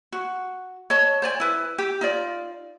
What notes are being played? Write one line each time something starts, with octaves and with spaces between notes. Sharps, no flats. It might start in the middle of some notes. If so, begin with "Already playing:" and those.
F#4
C#5 D#5 A5
C5 D5 G#5
E4 B4
G4
D#4 F4 D5